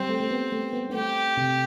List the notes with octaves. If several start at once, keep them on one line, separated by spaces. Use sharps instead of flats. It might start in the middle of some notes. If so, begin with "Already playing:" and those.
Already playing: G3 C4
A3
A3
B3
A3
B3
B3
A3 G4
C3